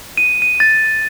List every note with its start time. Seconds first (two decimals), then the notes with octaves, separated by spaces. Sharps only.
0.17 D#7
0.42 D#7
0.60 A6